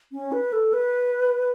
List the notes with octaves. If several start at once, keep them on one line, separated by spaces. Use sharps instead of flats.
C#4
B4
A4
B4